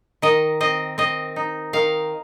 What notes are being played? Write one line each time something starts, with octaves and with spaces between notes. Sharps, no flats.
D#3 D#5
C4 D#5
C4 D#5
D#4
D#3 F5